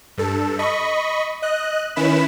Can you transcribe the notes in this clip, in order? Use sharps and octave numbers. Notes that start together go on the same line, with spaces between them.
G2 A4
D#5 B5 C#6
D#5 F#6
D#3 C#4 E4 B4 B5 E7